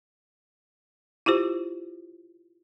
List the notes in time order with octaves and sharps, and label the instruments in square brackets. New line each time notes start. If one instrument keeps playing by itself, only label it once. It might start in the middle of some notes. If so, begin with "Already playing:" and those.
[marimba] E4 F4 G4 C5